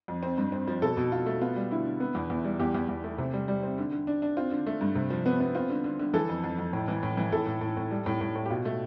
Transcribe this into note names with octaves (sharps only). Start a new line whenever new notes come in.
F2
C4
G2
C4
F3
B2 A4
B2
B2 F4
A3
B3 F4
G3
D3 E4
D3
B3
E2
E2
G3
E2 G4
E2
E2
A3
C3
G3
G3
C4
D3
D3
D4
D4
C4 F4
D3
A3
G2
C3
F3
B3
B3
C4 F4
D3
D3
D3
E3 A4
F2
F2
F2
A2
E3
A2
E3
A2 A4
A2
A2
A2
G3
A2
A2
A2
G4
B2 F4
A3